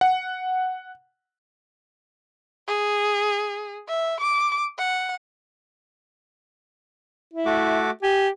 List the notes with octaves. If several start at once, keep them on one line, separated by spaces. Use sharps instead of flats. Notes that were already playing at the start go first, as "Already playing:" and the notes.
F#5
G#4
E5
D6
F#5
E4
A3 F#4 D6
G4 G#5